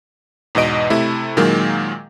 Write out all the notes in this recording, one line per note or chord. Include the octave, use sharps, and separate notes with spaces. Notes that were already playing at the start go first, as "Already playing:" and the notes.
E2 G#2 B2 D#5 D7
C3 A3 E4
A#2 D#3 F#3 G#3 A#3